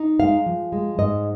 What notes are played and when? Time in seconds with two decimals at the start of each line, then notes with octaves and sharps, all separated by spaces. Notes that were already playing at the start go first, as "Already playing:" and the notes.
Already playing: D#4
0.19 G#3 F5
0.46 F3
0.72 G#3
0.98 G#2 D#5